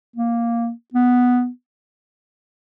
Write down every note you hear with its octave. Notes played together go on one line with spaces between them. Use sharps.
A#3
B3